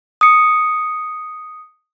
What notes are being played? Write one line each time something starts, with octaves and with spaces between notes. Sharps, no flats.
D#6 C#7